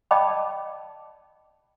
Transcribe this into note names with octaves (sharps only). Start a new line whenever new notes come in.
D5 D#5 G5 A5 B5 D6